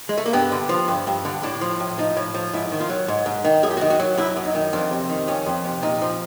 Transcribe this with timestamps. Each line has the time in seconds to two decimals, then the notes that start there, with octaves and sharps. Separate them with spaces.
0.09 G#3
0.18 A3
0.26 A#3
0.33 G2 B3
0.52 D3
0.69 F3
0.88 G2
1.07 G2
1.25 D3
1.43 A2 D4
1.61 F3
1.80 A2
1.98 F3 D#4
2.17 A2
2.34 F3
2.53 G#2 E4
2.72 D#3
2.80 F4
2.89 F#3
3.08 G#2
3.26 G#2
3.45 D#3
3.63 F#2 G#4
3.71 G4
3.77 F#4
3.81 D#3
3.90 F#4
4.00 F#3
4.17 F#2 E4
4.36 F#2
4.45 D#4
4.55 D#3
4.73 F2 D4
4.91 C3
5.10 D#3
5.28 F2 C#4
5.46 F2
5.65 C3
5.83 A#2 D#4
6.02 F3